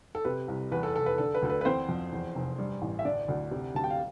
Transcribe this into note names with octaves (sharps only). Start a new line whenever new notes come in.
A4
C3 B4
C2
E2 B4
A4
F1 A4
B4
D3 A4
B4
D2 A4
B4
B4
E3 C4 C5
F2
E2
F1
G2
A1
E5
D3 D4 D5
D2
C3
D2 A5
G5
F5